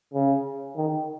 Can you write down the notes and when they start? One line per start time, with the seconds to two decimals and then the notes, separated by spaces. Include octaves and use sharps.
0.14 C#3
0.76 D#3